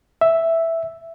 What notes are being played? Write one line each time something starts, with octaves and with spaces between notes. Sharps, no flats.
E5